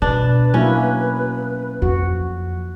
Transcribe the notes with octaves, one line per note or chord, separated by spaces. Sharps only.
B2 D4 B4
F#3 A#3 C#4 E4
F2 F#4